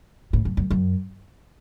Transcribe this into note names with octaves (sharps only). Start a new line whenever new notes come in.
A2
F#2
F#2
F#2